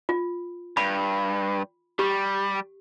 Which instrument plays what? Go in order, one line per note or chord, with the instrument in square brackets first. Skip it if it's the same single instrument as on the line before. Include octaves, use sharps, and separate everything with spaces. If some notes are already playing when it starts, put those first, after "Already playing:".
[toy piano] F4
[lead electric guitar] G2 [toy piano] B5
[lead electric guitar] G3 [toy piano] G4